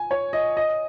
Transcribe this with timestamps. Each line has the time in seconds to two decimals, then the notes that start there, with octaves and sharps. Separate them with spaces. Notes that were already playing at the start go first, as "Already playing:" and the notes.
Already playing: G#5
0.11 C#5
0.33 D#5
0.57 D#5